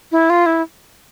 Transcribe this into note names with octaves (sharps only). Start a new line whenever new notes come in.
E4
F4
E4